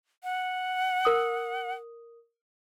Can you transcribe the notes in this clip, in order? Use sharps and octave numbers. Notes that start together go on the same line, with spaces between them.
F#5
A#4 D#6